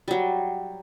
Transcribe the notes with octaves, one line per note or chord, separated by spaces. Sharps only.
F#3 G3